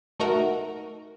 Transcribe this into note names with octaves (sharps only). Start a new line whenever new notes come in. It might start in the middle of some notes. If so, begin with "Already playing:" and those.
A3 D#4 F#4 A#4